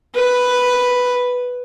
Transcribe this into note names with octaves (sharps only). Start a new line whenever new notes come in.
B4